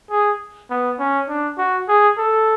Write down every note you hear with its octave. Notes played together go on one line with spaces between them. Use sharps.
G#4
B3
C#4
D4
F#4
G#4
A4